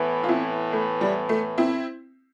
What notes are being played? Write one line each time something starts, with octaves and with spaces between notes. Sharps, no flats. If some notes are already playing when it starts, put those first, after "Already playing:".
Already playing: A2 E3 B3
F4
C4 E4
A3
G3
A3
C4 E4